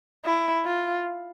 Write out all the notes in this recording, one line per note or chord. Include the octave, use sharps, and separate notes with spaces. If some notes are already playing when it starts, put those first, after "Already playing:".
E4
F4